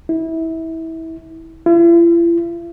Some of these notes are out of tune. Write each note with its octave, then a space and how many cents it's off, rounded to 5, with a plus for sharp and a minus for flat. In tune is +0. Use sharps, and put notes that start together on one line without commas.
E4 -25
E4 +45